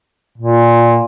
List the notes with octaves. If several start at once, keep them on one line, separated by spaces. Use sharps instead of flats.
A#2